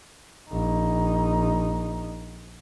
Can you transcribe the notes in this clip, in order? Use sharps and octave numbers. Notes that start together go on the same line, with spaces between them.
A#1 D#4